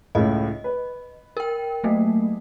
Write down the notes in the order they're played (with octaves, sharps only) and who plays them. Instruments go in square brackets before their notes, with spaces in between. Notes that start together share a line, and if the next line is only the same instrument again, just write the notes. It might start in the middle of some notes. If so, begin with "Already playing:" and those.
[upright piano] C#2 A2 [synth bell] D#5
[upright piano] B4
[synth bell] A#4 G5
F#3 A3 A#3